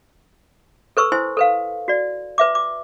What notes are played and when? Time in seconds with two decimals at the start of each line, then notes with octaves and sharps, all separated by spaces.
0.97 A4 B4 C#6 E6
1.12 E4 C5 G#5 C6
1.37 A4 B4 F5
1.88 F#4 D5
2.38 B4 E5 D6
2.55 D6